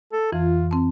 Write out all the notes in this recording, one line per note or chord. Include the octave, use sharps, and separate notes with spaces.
A4
F2 E3 F4
C4 A5